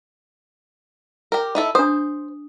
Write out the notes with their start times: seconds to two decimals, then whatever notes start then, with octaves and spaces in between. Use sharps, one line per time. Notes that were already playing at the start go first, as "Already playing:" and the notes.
1.32 G4 A#4
1.55 D#4 E4 A4
1.75 D4 C5 D#6